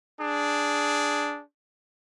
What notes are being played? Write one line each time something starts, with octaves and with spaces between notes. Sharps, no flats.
D4 G#4